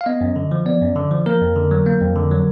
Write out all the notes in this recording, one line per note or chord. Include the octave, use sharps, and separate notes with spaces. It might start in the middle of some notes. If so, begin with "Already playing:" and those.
F5
B3 D#5
F#2
D3
F3
B3 D5
F#2
D3
F3
A#3 A#4
F2
D3
F#3
A#3
F2
D3
F#3